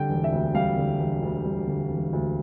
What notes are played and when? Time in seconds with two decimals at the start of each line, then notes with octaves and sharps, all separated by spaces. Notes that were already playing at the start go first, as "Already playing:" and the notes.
Already playing: D3 G3 G5
0.09 E1
0.24 E5
0.32 D2
0.54 G3 F5
0.77 D3
0.99 E1
1.22 D2
1.45 G3
1.67 D3
1.90 E1
2.13 D2